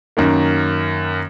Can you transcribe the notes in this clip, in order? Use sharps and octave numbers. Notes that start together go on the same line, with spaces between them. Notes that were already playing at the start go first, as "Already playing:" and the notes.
F#2 D#3 A#3